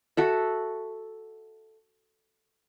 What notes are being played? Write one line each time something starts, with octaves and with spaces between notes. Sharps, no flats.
F#4 A4 E5